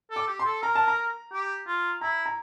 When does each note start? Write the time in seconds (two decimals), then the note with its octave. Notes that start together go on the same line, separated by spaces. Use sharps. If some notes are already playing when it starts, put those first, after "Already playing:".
0.10 A4
0.16 D6
0.28 G4
0.39 C6
0.45 A4
0.63 A#4 A#5
0.75 A5
0.88 A#5
1.32 G4
1.67 F4
2.01 E4 A#5
2.26 A#5